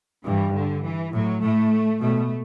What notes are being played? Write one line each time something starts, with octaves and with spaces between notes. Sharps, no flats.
G2 E3
D3
E3
A2 F#3
A2 A3
B2 A3